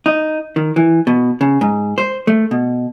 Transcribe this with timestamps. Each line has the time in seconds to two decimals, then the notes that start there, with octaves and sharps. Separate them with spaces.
0.06 D#4
0.56 D#3
0.76 E3
1.07 B2
1.41 C#3
1.61 G#2
1.98 C5
2.27 A3
2.51 B2